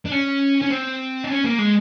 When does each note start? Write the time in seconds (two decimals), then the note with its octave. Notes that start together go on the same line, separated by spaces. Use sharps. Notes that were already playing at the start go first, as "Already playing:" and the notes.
0.06 D4
0.12 C#4
0.61 C#4
0.70 C4
1.24 D4
1.29 C#4
1.44 A#3
1.59 G#3